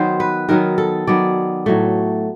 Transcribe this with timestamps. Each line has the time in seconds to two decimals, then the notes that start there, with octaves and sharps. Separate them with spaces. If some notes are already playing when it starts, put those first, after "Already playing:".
Already playing: D#3 F#3 B3 C5
0.20 B4
0.49 D#3 F#3 B3 A#4
0.78 A4
1.07 D#3 F#3 B3 D5
1.66 A2 F#3 A3